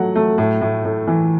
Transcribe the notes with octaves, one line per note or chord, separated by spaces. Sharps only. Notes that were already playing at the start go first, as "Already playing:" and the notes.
Already playing: F#3 A3 F#5
A3
A2
A2
A2
E3